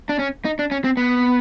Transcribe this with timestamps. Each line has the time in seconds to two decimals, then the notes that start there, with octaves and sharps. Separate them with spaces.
0.09 D4
0.19 C#4
0.45 D#4
0.59 D4
0.71 C#4
0.84 C4
0.97 B3